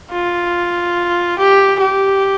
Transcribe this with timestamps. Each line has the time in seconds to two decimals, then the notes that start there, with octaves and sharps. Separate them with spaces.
0.12 F4
1.39 G4
1.81 G4